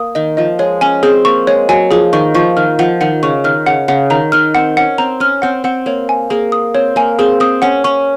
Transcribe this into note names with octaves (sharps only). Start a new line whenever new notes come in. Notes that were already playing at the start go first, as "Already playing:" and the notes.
Already playing: A#3 D#6
D#3 D#5
F3 D#5
G#3 C#5
C#4 G#5
C4 G#4
A#3 C#6
G#3 C#5
F#3 G#5
F3 G#4
D#3 C#6
F3 C#6
D#3 F6
F3 F#5
D#3 F#5
C#3 C#6
D#3 F6
C#3 F#5
C#3 F#5
D#3 A#5
D#3 F6
C4 F#5
C#4 F#5
C4 A#5
C#4 F6
C4 F#5
C4 F#5
A#3 C#5
G#5
A#3 G#4
D#6
C4 C#5
A#3 G#5
C4 G#4
C4 D#6
C#4 F#5
C#4 C#6